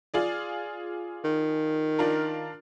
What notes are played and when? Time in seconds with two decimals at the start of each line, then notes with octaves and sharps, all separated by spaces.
0.14 F4 G#4 D5
1.25 D#3
1.98 D4 F4 A#4